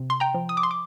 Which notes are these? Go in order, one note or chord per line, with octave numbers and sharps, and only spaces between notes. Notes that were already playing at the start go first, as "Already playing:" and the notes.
Already playing: C3
C6
G5 A#5
F3
D#6
D6
C6
D6